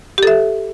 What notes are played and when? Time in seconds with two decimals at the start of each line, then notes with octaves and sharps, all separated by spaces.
0.18 G4
0.23 A4
0.27 E5